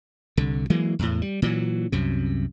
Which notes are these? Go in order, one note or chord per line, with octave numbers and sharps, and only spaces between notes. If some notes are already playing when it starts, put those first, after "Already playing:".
C2 D3
E3 F#3 G#3 A#3
E2 A2
G3
A#2 E3 F#3
C2 F#2 C3